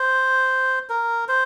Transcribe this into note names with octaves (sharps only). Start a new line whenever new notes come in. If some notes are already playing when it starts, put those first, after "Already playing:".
Already playing: C5
A#4
C5